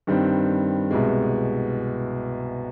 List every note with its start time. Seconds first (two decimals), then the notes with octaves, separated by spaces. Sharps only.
0.07 G2 D#3 G3 C4
0.91 C2 B2 G#3